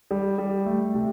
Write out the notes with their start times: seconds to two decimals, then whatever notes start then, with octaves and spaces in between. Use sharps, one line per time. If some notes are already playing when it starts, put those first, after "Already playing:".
0.11 G3
0.38 G3
0.66 A3
0.94 C3